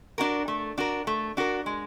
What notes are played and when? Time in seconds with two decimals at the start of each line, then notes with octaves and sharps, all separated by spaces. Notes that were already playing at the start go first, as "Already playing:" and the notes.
0.18 D4 F#4 A#4
0.48 A3
0.78 D4 F#4 A#4
1.07 A3
1.37 D4 F#4 A#4
1.66 G#3